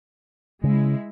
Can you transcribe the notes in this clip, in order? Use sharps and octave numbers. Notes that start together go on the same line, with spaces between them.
C#3 G#3 E4